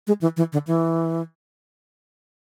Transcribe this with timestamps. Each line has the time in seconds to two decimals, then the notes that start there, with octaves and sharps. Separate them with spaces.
0.07 G#3
0.21 E3
0.37 E3
0.53 D3
0.67 E3